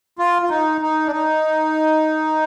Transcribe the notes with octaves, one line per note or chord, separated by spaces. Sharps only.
F4
F4
D#4
D#4
D4
D#4